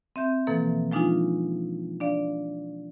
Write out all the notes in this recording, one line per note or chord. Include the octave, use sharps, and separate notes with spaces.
C4 E5 G6
B2 E3 F3 A#3 A4
F3 G#3 D4 D#4 F4 G#5
D4 D5 F5